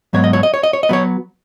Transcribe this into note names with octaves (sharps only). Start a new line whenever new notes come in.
G#2 F#3 B3 C#5
D#5
C#5
D#5
C#5
D#5
C#5
D#5
F#3 B3 C#5